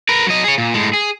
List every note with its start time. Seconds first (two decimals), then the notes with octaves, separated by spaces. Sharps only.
0.09 A#4 B4
0.27 F#3 D#5
0.44 G#4 C#5
0.58 A#2
0.74 A2 G#3
0.93 G#4